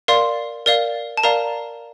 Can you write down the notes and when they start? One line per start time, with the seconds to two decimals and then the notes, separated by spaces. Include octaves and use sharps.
0.08 A#4 D5 F5 C6
0.66 A#4 D5 F5
1.17 A5
1.23 A#4 D5 F5 A#5